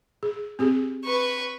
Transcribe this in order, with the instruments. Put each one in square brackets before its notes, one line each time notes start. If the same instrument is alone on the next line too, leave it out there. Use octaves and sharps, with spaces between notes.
[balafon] G#4
C4 G4 G#4
[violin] B4 C#6